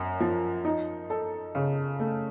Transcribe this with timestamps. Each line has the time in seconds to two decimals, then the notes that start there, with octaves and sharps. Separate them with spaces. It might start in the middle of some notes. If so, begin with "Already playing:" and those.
Already playing: F#2
0.20 F3
0.65 D#4
1.10 A4
1.55 C#3
2.00 A3